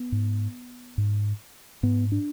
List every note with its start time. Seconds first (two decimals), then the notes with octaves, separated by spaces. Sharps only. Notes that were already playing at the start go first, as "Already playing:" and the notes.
Already playing: B3
0.12 G#2
0.98 G#2
1.83 G#2 B3
2.12 D4